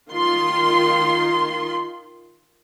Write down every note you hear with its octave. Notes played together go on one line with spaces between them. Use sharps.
D#3 F4 C6